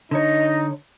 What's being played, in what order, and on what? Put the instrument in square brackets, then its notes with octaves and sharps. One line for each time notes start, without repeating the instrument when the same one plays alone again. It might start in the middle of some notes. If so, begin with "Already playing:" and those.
[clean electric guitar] D3 C#5 [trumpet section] D#4 [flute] D#5